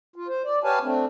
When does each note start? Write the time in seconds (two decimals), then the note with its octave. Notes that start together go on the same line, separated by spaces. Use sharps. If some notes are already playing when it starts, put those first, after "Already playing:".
0.16 F4
0.28 C5
0.44 D5
0.64 G4 B4 C#5 F5 G#5 A5
0.82 A3 C4 D4